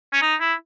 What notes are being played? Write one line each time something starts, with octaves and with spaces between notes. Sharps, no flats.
C#4
D#4
E4